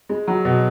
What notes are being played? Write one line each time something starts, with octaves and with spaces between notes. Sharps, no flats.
G#3
F#3
B2